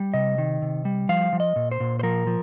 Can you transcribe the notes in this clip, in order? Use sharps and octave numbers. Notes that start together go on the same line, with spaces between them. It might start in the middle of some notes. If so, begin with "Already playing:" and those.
Already playing: G3
C3 D#5
D#3
C3
G3
F3 F5
F3
D#5
A#2
C5
A#2
C5
F3 A#4
F3